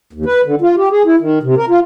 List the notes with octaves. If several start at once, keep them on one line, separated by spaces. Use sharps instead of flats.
D#2
B4
D3
F4
G4
G#4
E4
D#3
C3
A#4
F4